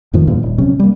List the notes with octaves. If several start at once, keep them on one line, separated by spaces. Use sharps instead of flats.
F2 A2 D#3 F3
E2 G2 A#2
D#1
C3 F#3 C4 C#4
G3 A#3